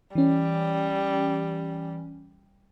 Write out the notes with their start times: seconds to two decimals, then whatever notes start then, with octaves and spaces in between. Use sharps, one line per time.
0.15 E3 G3 C#4